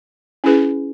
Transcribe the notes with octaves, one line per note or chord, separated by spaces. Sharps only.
C#4 E4 G#4 B4